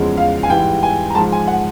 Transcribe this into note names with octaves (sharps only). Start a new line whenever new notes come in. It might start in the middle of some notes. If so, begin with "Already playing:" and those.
Already playing: E2 C#3 F3 G#3
F5
G#5
G#2 E3 G3 G5
G#5
A#5
G#2 F3 G#3 A5
G#5
F#5